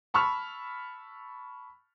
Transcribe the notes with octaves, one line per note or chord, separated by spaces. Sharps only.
A5 B5 C#6 E6 F6